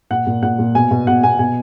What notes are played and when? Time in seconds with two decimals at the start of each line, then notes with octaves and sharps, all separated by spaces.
0.10 A#2 F#5
0.27 A#2
0.42 A#2 F#5
0.59 A#2
0.75 B2 G#5
0.91 B2
1.07 B2 F#5
1.23 B2 G#5
1.39 B2 G#5